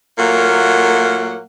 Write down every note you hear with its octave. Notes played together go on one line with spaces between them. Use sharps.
A#2 F#3 A3 A#3 A#4 F#5